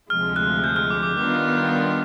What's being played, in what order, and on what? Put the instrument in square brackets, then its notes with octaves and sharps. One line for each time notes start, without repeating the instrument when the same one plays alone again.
[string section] D2 C3 F3 G#3 [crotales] F6
[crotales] F#6
G6
F6
D6
D6
[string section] D#3 G3 B3 D4 F4 [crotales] D6